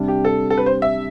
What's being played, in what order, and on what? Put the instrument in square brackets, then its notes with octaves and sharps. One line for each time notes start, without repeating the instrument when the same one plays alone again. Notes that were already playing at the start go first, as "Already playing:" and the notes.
Already playing: [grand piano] C3 G3 D4
[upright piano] G4
A4
A4
B4
C5
E5